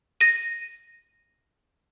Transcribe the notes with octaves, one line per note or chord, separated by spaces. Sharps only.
A#6 D#7